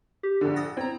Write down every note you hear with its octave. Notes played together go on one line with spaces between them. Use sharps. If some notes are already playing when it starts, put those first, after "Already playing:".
G4
A#1 D3
D#6 A6 A#6
C4 E4 A#5